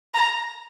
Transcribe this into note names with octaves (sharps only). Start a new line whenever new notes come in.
A#5